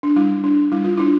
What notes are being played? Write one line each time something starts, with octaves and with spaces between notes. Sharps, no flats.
D4
G3 E4
D4
G3 E4
F4
D4 E4